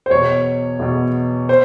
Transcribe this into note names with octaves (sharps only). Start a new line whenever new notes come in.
C5
E2 B2 C#5
E2 B2
C5